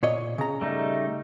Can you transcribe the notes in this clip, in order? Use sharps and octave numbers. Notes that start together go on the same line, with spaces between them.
A#2 C#5 D#5
C#3 A#5
G3 A3 D#4